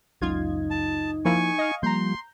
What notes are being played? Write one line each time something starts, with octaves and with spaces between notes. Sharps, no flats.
F#1 C#2 F#2 D#4 F4 G#6
A5
F3 A#3 E4 G#5 C#6
D#5 F5
F3 G3 A#3 A#5 C6 G6